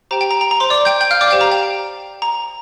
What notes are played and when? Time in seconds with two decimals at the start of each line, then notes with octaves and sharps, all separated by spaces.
0.11 G4 C5 G5 A#5
0.21 G5
0.31 A#5
0.41 A#5
0.51 A#5
0.60 C5 C6
0.70 D5 D6
0.85 G5 G6
1.01 G5 G6
1.11 F5 F6
1.21 D5 D6
1.31 G4 C5 F5 G5
1.41 A#5
1.52 G5
2.22 A#5